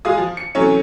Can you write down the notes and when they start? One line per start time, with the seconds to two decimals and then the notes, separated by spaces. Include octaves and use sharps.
0.05 G#3 F4 G#4 D#6
0.18 F3
0.37 C#7
0.55 C3 E3 F#3 A3 C#4